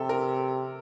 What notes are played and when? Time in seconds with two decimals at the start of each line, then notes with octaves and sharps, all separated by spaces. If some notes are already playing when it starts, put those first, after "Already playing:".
Already playing: C3 G4 A4
0.09 A#4